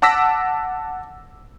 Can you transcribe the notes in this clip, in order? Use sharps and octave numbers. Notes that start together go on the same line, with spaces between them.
F#5 A5 D6 E6 A#6 B6